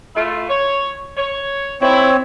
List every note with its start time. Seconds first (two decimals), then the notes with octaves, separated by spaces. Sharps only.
0.15 A3 E4 F4
0.48 C#5
1.17 C#5
1.81 D#3 C4 C#4 E4 C#5